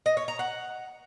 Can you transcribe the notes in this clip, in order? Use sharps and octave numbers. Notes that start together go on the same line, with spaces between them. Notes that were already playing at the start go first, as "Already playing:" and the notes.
D#5
C#5
A#5
F#5